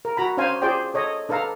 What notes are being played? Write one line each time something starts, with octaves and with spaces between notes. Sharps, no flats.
A#4
F#4 A#5 B5
C#4 D4 C5 F5 G#5
F4 G#4 C5 D5 G5
A4 C#5 D#5
D4 A4 B4 F5 A#5